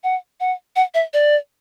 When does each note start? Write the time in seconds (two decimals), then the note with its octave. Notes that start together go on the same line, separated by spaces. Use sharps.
0.04 F#5
0.40 F#5
0.76 F#5
0.94 E5
1.13 D5